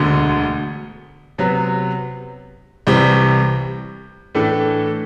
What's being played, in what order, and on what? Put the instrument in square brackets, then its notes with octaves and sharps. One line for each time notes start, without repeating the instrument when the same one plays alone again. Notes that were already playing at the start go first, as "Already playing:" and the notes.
Already playing: [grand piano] E1 D2 D3
C3 F#3 B3
C2 C3 E3 G3 C4
A2 E3 A3 D4 A4